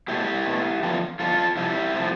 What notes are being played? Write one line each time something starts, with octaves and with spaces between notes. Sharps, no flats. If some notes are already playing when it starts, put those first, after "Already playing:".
B2 A3 E4 G4
B2 A3
E2 D3 F3 A3
E2 D3 F3 F4 A4
F2 C3 F3 E4 G4
C3 F3 A3